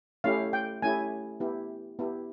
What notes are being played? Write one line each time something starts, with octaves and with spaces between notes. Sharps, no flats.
A3 C#4 E4 G4 F5
G5
A3 C#4 E4 G4 G#5
B3 E4 G4
B3 E4 G4